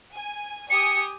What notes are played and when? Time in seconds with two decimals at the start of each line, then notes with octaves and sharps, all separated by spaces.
0.13 G#5
0.70 G4 G#5 D#6 C#7